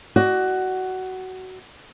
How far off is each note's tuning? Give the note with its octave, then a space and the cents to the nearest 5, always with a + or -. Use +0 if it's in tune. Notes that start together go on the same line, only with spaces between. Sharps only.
F#4 +15 D5 +30